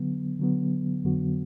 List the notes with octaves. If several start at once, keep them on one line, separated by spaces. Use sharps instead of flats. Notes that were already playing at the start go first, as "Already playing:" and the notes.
Already playing: D3 F#3 B3
D3 F#3 B3
F2 D3 F#3 B3 F#4